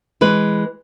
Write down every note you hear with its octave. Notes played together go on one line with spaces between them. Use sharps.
E3 G#3 B4